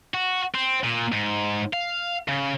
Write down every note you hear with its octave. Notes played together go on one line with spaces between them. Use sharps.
F#4
C4
A#2
G#2
F5
C#3